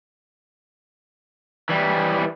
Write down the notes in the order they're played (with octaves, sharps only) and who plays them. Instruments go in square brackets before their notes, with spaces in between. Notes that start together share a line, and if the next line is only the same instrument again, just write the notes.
[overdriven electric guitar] E3 G3